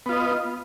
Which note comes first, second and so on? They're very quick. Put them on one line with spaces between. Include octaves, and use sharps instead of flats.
B3 F4 D#5